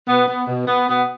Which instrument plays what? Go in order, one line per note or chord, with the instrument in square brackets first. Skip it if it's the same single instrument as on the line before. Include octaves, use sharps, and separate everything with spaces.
[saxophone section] B2 B3
B3
B2
B3
B2 B3